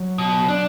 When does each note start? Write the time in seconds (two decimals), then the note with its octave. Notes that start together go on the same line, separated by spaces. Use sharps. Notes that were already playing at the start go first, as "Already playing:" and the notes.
Already playing: F#3
0.18 B2
0.48 D4